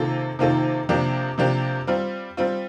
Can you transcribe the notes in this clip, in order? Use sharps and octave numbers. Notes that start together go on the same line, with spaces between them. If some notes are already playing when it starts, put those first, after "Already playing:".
Already playing: C3 D#3 A#3 F4 A4
C3 D#3 A#3 F4 A4
C3 F3 A#3 D4 G4
C3 F3 A#3 D4 G4
G3 C4 F4
G3 C4 F4